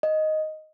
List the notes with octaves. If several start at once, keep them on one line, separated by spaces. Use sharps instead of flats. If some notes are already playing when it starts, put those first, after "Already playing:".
D#5